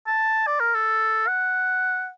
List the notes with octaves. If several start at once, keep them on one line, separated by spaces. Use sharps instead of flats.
A5
D5
A#4
A4
F#5